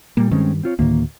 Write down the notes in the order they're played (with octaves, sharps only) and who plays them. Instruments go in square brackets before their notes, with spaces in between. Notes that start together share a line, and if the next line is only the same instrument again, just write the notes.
[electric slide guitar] A#2 G3 [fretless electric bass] A#3
[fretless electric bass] G2 D#3 [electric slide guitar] G#3 C4 C#4
[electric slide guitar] C4 F4 C#5
[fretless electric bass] D2 A2 [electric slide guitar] D#3 A#3